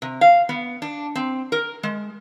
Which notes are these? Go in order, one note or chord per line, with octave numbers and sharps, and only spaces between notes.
C3
F5
B3
D4
C4
A#4
G#3